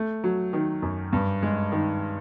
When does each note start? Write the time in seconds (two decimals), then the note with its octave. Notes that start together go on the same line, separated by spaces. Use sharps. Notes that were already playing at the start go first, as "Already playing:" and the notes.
Already playing: A3
0.24 F#3
0.53 D#3
0.82 F#2
1.13 G2
1.43 G#3
1.72 D#3